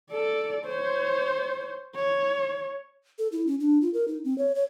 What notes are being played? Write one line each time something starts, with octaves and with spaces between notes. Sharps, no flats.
A4 D5
C5 C#5
C#5
A4
E4
C#4
D4
F4
A#4
D#4
C4
C#5
C#5